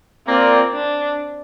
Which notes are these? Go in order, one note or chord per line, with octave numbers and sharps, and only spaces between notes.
A#3 C4 F4 A#4 D5
D4